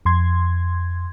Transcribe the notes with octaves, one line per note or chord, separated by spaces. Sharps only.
F2 C6 G#6